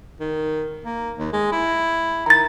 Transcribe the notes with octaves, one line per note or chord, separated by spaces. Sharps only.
D#3
A#3
D#2
G#3
E4
D#3 A#5 A6